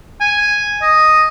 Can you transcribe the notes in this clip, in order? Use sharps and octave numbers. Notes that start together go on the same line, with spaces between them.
G#5
D#5